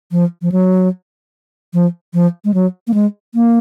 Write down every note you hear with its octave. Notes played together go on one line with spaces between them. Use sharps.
F3
F3
F#3
F3
F3
G#3
F#3
A#3
G#3
A#3